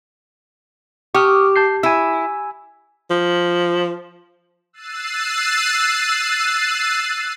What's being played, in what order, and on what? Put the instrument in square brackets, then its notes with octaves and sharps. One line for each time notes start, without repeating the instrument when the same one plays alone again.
[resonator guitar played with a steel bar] G4 [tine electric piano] C#6 D#6 F6
[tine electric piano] A5 G6 C7
[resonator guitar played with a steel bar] E4 [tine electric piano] G#5 E6
[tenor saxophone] F3
[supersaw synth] E6 F#6 A6 C7 D#7